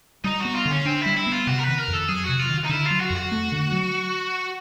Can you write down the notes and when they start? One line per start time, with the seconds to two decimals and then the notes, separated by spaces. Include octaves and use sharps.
0.24 G3 D#4
0.40 F#4
0.45 B3
0.55 F4
0.65 D3
0.71 C#4
0.85 C4 D4
1.01 G3 E4
1.17 E4
1.27 B3
1.32 F4
1.47 C3 F#4
1.58 A#4
1.63 D#3 B4
1.78 A#4
1.88 F2
1.93 A4
2.08 F#3 G#4
2.24 F#4
2.29 C3
2.39 F4
2.49 D#3
2.64 D#4
2.69 D3 E4
2.85 F4
2.90 F#3
3.00 F#4
3.10 F2
3.16 F#4
3.32 A3
3.52 D3
3.72 F#3